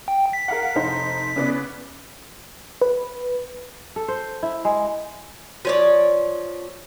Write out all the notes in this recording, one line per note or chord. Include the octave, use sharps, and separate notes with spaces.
G5
B6
A#4 F5 F#5
F1 D#4 C5
C#3 B3 D5
B4
A4
C5
E4
G#3
F3 C#5 D5